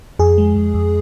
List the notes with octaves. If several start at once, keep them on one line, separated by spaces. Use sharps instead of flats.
F2 G#4
G#3
F2
F2